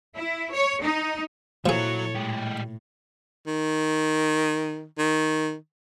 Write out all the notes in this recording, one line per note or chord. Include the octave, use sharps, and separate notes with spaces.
E4
C#5
D#4
A#2 F3 F#3 E4 G#4 A4 C#5
A2 G#3 G4
D#3
D#3